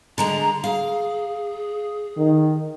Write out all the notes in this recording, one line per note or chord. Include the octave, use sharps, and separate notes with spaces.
D3 G#3 G#4 A#5
G#4 F5
D#3